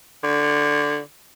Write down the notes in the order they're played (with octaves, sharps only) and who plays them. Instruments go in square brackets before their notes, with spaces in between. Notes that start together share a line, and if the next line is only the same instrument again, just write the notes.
[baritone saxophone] D3